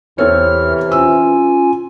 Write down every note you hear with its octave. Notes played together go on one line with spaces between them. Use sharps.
E2 C3 E3 C4 A4 C#5 F6
C#4 F4 G#5 E6